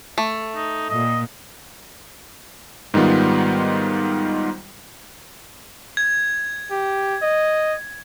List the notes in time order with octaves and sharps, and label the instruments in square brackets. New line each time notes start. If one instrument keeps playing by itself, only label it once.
[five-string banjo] A3
[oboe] D#4
[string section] A#2 [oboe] D#5
[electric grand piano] G#2 D#3 G3 B3 F4
[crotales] G#6
[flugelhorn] G4
D#5